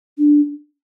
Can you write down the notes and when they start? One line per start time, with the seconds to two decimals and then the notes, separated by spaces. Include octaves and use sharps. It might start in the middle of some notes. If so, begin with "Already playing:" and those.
0.18 D4